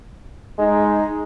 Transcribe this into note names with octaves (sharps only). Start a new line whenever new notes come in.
G#3 D#4